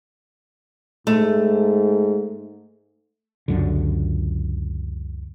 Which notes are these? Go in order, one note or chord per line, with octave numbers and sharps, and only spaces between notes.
G#2 A3
C#2 F#2 D3